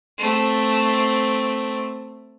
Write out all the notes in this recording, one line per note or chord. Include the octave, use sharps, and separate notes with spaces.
A3 C4